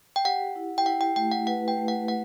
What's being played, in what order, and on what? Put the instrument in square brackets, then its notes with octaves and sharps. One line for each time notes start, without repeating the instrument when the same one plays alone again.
[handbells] G5
[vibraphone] G4 [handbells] F#5
[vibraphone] E4
[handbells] G5
[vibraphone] E4 [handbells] F#5
[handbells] G5
[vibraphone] A3 [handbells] G5
[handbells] F#5
[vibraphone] B4 [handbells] F#5
[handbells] G5
[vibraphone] A3
[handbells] F#5
[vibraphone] A3 [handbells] F#5